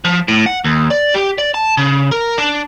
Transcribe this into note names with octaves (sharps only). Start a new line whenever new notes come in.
F3
A2
F#5
D#2
D5
G4
D5
A5
C#3
A#4
D4